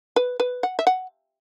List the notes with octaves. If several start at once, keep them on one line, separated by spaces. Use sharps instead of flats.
B4
B4
F#5
E5
F#5